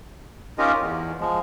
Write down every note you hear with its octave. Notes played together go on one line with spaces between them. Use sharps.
C#4 D#4 F4 G4 A#4 D#5
E2
F3 G#3